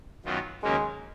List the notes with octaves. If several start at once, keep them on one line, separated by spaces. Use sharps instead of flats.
F#2 D#3 F#3 B3 F4
D#2 C#3 F#3 G#3 A#3 C#4